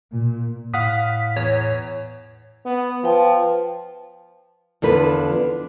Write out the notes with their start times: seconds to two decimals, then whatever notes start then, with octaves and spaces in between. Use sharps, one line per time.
0.12 A#2
0.74 A2 F5 F#5 D#6 B6
1.36 E2 C#5
2.65 B3
3.04 F3 B4 G5
4.82 E2 D3 F3 B4
5.32 D4